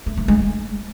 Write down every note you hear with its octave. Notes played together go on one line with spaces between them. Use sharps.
A3
A3
G#3
A3